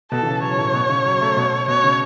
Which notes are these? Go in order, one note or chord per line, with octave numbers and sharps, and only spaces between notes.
B2 A4
E3
C#3
F#3 C#5
A2
B2
C#3
F#3
A3
B2
B2 C#5
C#3